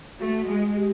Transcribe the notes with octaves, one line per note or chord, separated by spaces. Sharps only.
A3 F#4
G#3
G4